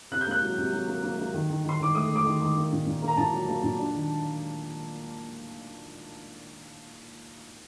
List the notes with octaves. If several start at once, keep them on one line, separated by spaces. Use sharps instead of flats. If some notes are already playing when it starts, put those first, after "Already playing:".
C3 F#6
G6
A#3 F#6
F#3
C3
F#3
A#3
A#3
A#3
D#3
D#3
D#3 C6
D#3 D6
A3 D#6
A3
D6
D#3
D#3
A#3
A#2
A#2
A#3
A#5
A#2 A5
F#3
A#3
A#2
D4
D#3